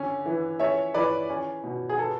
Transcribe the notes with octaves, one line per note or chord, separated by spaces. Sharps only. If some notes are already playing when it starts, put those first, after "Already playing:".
Already playing: D3 C#4
E3
C#4 C#5 E5
E3 B4 D5
C#4
B2
G#4
B3 A4